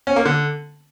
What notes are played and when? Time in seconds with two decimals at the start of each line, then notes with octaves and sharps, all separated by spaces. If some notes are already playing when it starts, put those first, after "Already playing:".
0.07 C#4
0.16 A#3
0.25 D3